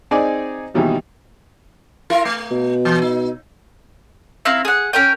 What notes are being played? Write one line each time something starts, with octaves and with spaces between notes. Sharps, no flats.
C4 D#4 G#4 D5 D#5 G#5
D#2 B2 D#3 E3 G3
E4 F4 A#4
A3
B2
E3
D#4
C4 E4 F5 A#5
G#4 F#5
C#4 A#4 G5